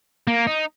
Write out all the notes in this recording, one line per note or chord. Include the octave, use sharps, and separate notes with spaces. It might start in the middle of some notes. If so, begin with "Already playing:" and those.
A#3
D#4